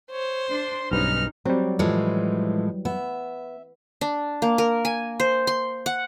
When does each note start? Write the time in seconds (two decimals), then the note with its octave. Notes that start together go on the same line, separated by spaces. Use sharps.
0.11 C5 C#5
0.49 D4 C6
0.92 B1 G2 C#4 D#4 B4 F6
1.46 F#3 G3 C4
1.79 A2 E3 F3 G#3
2.85 B3 E5
4.01 D4
4.42 A#3
4.58 A#4
4.85 G#5
5.20 C5
5.47 C6
5.86 F#5